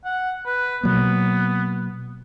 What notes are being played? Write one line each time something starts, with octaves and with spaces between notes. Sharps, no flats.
F#5
B4
B2 F#3 A#3 B3